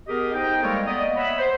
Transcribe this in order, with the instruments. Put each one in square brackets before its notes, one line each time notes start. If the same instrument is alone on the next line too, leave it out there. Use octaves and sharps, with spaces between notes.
[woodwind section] B3 G4 G#4 A#4 D#5
D#4 C5 D#5 G5
G3 G#3 A#3 A4 A#4 C#5
A#3 B3 D5 D#5
C#5 E5 F#5 B5
C5